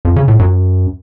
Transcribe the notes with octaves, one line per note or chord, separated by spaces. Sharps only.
F2
C#3
A2
F#2